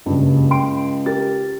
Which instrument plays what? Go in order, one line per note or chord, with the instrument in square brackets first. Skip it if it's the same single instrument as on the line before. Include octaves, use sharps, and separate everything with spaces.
[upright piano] F#1 G2 [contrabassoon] C#2
[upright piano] G5 C6 D7
G4 A#4 A6